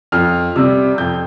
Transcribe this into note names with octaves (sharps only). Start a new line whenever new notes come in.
F2 F6
C3 G3 C4 E6
F2 G6